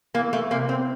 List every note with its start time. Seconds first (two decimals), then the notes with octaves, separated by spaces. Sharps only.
0.14 E3 A#3
0.33 A3
0.51 C3 A#3
0.69 C4